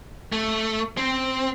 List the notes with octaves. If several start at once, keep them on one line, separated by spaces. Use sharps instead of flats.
A3
C4